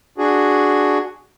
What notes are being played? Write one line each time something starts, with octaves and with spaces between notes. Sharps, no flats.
D4 F#4 G#4